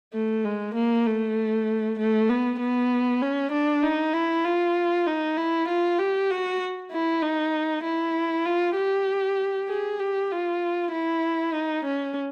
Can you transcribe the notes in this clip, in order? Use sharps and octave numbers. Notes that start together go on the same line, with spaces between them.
A3
G#3
A#3
A3
A3
B3
B3
C#4
D4
D#4
E4
F4
D#4
E4
F4
G4
F#4
E4
D#4
E4
F4
G4
G#4
G4
F4
E4
D#4
C#4